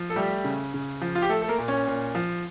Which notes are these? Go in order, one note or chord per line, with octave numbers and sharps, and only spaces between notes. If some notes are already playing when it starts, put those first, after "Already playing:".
Already playing: F3
A4
G3 A3 G4
C#3
C#3
F3
F4
G4
A3 A4
A4
A#3 A#4
A#2
C#4 C#5
A#2
F3